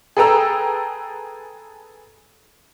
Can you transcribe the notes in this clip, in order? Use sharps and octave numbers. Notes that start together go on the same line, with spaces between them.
G#4 A4 B4 G5 A#5 E6